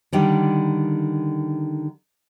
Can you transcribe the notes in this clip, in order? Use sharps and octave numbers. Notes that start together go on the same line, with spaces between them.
D3 D#3 G3